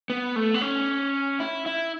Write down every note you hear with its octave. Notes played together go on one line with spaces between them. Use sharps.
B3
A3
B3
C#4
E4
E4